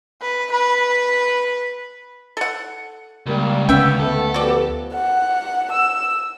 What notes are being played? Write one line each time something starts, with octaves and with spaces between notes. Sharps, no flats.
B4
B4
A4 F#5
C#2 G3 A#3
D2 B3 C#4 E5 G5
A3 B3 A4
F3 B3 F#4 G4 D5
F#5
E6